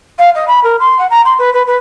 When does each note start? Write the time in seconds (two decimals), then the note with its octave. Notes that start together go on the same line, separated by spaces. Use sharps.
0.18 F5
0.35 D#5
0.47 B5
0.63 A#4
0.79 C6
0.98 F#5
1.10 A#5
1.25 C6
1.38 B4
1.53 B4
1.67 B4